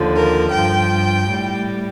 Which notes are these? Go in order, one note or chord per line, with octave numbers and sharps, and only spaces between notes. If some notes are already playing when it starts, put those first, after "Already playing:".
Already playing: D#2 D3 F3
A#4
G2 F3 G5
A2 G3